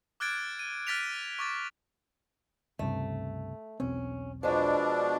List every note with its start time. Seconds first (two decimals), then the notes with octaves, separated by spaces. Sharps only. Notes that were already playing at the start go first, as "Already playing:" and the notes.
0.20 D6 F6 F#6 G#6 A6 D7
0.59 D#7
0.87 F6 F#6 A6 B6 D7 F7
1.39 C#6 D6 A6
2.79 C#2 G2 C3 A3
3.80 E1 B1 C4 C#4
4.43 B2 F3 G#3 D4